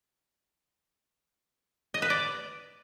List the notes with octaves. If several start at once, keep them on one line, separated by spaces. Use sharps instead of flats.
D#5
B4
D5